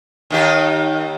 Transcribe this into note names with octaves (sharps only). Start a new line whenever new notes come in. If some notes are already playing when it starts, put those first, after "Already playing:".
D#2 D#3 G4